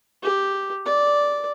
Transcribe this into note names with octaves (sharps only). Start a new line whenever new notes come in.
G4
D5